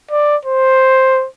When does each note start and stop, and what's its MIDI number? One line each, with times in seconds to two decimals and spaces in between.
0.11 0.36 74
0.45 1.27 72